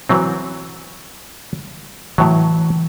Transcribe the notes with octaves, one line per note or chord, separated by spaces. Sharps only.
E3 F#3 C4
A2 E3 F#3